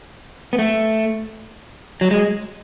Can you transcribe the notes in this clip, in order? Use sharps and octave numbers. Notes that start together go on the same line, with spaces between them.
B3
A3
F#3
G#3